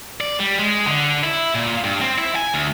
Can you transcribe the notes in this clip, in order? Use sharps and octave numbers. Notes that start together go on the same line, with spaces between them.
D5
G3
G#3
D3
E4
A#2
G2
C4
E4
G#5
D2